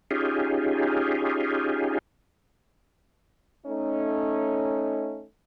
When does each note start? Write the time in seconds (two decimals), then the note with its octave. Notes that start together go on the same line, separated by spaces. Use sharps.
0.11 C#4 D#4 F4 G4 G#4
3.67 A3 C#4 D#4